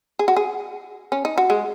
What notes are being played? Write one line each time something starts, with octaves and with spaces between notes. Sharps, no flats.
G#4
F#4
G#4
C#4
D#4
F#4
G#3